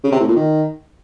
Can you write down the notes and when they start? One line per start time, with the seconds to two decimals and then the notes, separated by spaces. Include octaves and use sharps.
0.04 C#3
0.12 C3
0.20 A2
0.28 A#2
0.36 D#3